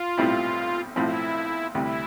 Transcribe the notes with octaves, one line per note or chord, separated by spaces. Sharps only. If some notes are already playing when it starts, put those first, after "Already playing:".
Already playing: F4
B1 A2 G3 C4 E4
B1 A2 F3 C4 E4
D2 C3 G3 E4